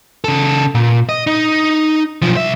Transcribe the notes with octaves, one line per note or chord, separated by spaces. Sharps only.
C#3 A4
A#2
D#5
D#4
B1 F3
C2 E5